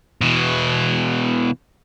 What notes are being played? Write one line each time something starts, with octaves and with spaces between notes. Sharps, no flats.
B2 E3